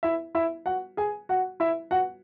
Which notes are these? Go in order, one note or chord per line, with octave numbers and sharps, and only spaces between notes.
E4 E5
E4 E5
F#4 F#5
G#4 G#5
F#4 F#5
E4 E5
F#4 F#5